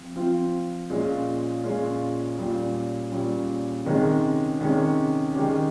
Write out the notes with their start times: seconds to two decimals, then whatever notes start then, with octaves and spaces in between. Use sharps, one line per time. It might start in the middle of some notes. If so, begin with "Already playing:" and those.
Already playing: F3 C4 F4
0.16 F3 C4 F4
0.90 A#2 G#3 C#4 F4
1.64 A#2 G#3 C#4 F4
2.38 A#2 G3 C#4
3.12 A#2 G3 C#4
3.85 C3 D#3 G#3 C#4
4.59 C3 D#3 G#3 C#4
5.34 D#3 G#3 C#4 G4